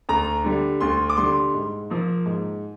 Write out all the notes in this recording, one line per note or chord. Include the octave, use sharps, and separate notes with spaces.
D2 A#5
D3 G3
D2 C6
D6
D3 G3 C6
G#2
F3 A#3
G#2